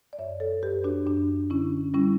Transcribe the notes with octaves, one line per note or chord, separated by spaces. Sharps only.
D5
F#2 C#5 E5
A4 C#5
F#2 G4 B4
D4 F#4
F#2 D4
D3 C#4 E4
G3 C#4 E4